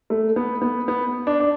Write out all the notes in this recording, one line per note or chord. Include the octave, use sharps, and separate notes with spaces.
A3
B3
B3
B3
D4
D4